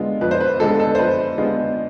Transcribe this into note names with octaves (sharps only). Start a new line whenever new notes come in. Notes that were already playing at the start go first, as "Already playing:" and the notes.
Already playing: D3 G#3 B3 F4
F2 B4
C5
B4
D3 G#3 B3 F4 A4
A4
C5
F2 B4
D3 G#3 B3 F4